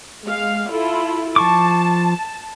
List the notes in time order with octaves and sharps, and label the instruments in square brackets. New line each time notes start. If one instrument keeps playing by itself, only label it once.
[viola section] G#3 F5
E4 F4 A4
[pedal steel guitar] F3 C#6 D6 [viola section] A5